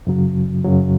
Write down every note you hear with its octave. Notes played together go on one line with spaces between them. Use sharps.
F#2 C#3 F#3
F#2 C#3 F#3